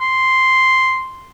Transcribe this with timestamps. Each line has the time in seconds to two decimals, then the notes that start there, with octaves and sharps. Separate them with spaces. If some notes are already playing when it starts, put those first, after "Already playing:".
0.01 C6